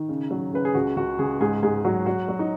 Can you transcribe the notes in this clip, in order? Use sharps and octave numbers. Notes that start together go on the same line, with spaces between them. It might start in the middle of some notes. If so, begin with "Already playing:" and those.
Already playing: D#3 D#4
C#3
F#3
C#3 B4
G#4
C#2 F#4
C#2 F#4
C#2 G#4
G#2 G#4
G#2 G#4
F#3 F#4
F#3 F#4
F#3
D#4